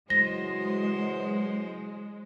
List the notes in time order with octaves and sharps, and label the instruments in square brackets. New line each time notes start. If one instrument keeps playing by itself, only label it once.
[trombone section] C#3 E3 F#3 [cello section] G#3 [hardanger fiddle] C5 [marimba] A#6